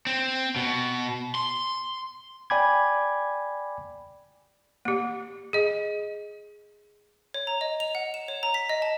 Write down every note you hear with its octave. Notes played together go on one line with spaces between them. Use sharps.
C4
B2
C6
D5 G5 G#5 B5 D6 G#6
A#3 G4
G#4 D#5
C#5
A#5
D#5
F7
F#5
E7
C#5
A#5
B6
D#5
A5